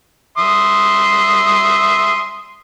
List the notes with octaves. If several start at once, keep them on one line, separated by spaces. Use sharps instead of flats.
E5 C6 D#6